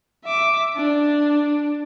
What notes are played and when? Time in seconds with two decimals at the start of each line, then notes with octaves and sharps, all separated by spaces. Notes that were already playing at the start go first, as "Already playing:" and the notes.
0.25 E5 D6
0.76 D4